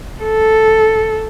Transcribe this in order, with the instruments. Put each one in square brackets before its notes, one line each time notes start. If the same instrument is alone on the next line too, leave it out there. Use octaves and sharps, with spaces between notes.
[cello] A4